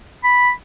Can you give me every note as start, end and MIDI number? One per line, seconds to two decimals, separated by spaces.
0.24 0.51 83